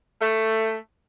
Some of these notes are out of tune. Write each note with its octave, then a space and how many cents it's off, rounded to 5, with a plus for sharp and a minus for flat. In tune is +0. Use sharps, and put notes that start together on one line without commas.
A3 +10